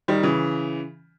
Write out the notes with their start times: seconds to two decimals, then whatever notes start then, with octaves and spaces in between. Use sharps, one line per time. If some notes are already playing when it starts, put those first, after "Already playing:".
0.08 D#3 G3
0.23 C#3 E3